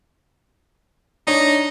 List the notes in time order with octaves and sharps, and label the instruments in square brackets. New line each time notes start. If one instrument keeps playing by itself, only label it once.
[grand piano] D4 C#5 [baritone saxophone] D#4